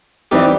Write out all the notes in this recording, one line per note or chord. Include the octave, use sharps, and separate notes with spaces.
E3 G3 C4 D#4 G4